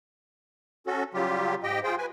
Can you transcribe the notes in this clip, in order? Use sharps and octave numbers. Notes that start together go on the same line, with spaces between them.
C#4 F#4 A4
C#3 F#3 G3 F4 G4
G#2 G4 D#5 G5
F4 G#4 C5 G5
B4 G#5